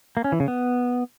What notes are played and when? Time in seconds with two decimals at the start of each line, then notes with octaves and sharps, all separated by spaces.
0.17 A#3
0.24 C#4
0.32 E3
0.40 C#3
0.48 B3